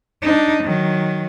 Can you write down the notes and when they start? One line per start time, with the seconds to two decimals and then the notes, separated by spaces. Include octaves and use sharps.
0.23 D4 D#4
0.64 D#3 F#3